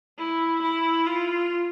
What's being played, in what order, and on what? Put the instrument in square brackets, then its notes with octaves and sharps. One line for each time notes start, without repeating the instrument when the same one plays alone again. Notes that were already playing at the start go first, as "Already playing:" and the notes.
[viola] E4
E4
F4